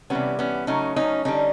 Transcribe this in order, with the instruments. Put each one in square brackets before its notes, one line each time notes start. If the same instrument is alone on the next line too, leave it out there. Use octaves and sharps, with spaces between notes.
[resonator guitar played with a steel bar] C3 E3 G3 B3 C#4
B3 C#4
C#3 F#3 A3 C#4 D#4
C#4 D#4
D3 G3 C#4 D#4